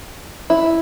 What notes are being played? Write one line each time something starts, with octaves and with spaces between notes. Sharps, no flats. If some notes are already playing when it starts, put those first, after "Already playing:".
E4